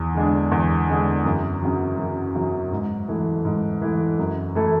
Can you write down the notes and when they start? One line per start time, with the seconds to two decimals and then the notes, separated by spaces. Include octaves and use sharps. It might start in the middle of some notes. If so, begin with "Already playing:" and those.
Already playing: E2
0.15 D3 G#3 D4
0.52 E2
0.88 D3 G#3 D4
1.25 F#2
1.62 C#3 F#3
1.98 F#2
2.35 C#3 F#3
2.72 G#2
3.08 E3 A3
3.45 G#2
3.82 E3 A3
4.19 F#2
4.55 E3 A3 E4 A4